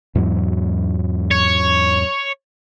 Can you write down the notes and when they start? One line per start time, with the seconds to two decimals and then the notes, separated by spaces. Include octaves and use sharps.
0.15 E2 G#2 F#3
1.31 C#5